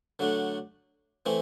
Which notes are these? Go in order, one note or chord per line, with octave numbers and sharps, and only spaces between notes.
D3 F#3 A3 D4
E3 A3 C4 E4